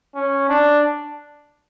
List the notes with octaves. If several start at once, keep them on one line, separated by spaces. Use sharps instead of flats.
C#4
D4